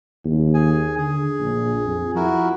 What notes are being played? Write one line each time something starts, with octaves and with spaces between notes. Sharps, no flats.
D#2
G#4 G#5
D3 G#4
A#1
F2
F3 E4 F#4 A#4